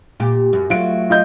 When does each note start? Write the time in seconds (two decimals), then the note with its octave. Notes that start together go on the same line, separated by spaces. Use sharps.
0.20 A#2 G4
0.53 F#2
0.70 F#3 A3 F4 D7
1.10 F4 D#5 G6